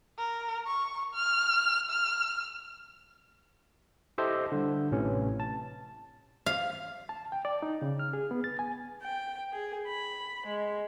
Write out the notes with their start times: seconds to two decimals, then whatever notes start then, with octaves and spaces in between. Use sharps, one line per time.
0.18 A#4
0.67 C#6
1.14 F6
1.90 F6
4.18 E4 G4 A4 C5 D#5 E5
4.52 D3 G3
4.91 A1 A2 C3 E3 C#4
5.40 A5
6.46 F5
7.09 A5
7.32 G5
7.45 D5
7.63 D#4
7.82 C#3
7.99 F6
8.13 G#4
8.31 B3
8.44 A6
8.59 G#5
9.03 G5
9.52 G#4
9.87 B5
10.46 G#3